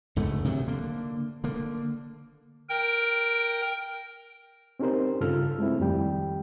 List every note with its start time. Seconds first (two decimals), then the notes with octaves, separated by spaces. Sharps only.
0.16 C#2 G#2 D3 A3
0.44 C3 D#3 F3 F#3
0.68 D3 A#3
1.44 D3 A#3
2.69 A#4 G5
4.80 C4 C#4 D#4 G4 A#4 C5
5.21 G2 C#3 F4 A4 E6 F6
5.59 G#3 A3 C4 E4
5.80 F2 D#3 G3 G5